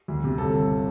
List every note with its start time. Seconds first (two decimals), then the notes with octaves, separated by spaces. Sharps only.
0.08 D2
0.24 C3
0.38 G1 A4
0.54 G1